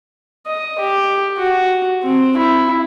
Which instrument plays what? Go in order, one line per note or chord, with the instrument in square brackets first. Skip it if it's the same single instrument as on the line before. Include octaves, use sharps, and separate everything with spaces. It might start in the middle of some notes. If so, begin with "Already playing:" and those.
[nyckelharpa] D#5
G4
F#4
C4
E4